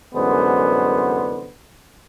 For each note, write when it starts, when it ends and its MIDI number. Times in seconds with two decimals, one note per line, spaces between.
0.14 1.51 36
0.14 1.51 42
0.14 1.51 50
0.14 1.51 56
0.14 1.51 59
0.14 1.51 72